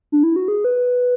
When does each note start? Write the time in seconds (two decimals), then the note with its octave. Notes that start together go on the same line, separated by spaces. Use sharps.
0.12 D4
0.23 E4
0.36 F#4
0.48 G#4
0.64 B4